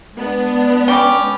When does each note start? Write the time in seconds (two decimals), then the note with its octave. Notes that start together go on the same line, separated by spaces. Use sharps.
0.16 G#3 B3 D4
0.88 C#4 G5 B5 D6